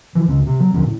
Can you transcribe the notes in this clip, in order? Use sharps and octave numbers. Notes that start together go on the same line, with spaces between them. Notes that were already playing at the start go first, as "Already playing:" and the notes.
E3 F3
C#2 C#3 G#3
C3
F#3
D#2 D3 F3 C#4
A2